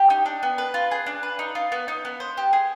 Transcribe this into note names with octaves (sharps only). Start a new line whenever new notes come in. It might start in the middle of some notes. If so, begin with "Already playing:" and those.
Already playing: G4
D#4
D4
B3
B4
F4
G#4
D4
B4
D#4
F4
B3
D#4
B3
C5
G4
G#4